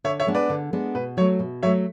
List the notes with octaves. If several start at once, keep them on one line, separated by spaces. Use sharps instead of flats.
D3 C#5 E5
C#5 E5
G#3 B3 D4
B4 D5
D3
G#3 B3 D4
B2 B4
F#3 A3 C#5
B2
F#3 A3 C#5 E5